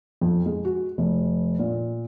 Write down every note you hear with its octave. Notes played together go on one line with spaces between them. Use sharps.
F2
G#3
F#4
F1
A#2